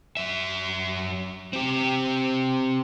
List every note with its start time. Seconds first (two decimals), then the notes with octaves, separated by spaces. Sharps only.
0.17 F#2 E5
1.53 C4 G4